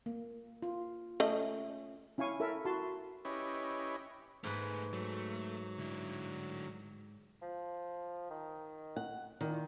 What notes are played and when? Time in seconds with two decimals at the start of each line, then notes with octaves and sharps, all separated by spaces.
0.06 A#3
0.62 F4
1.20 A3 C#4 D#5
2.18 C#4 E4 F5 G#5 C#6
2.40 E4 A4 A#4 E5
2.65 E4 F#4 A5 C6
3.25 C#4 E4 G4 B4 C#5 D#5
4.44 G#2 A3 G#4 B4
4.93 F#3 A3
5.79 D3 E4
7.42 F3
8.30 D#3
8.96 F#5
9.41 A#2 D#3